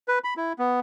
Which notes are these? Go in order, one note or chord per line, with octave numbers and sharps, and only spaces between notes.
B4
B5
E4
B3